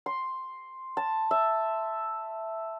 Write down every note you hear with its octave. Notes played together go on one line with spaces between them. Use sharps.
C6
A5
E5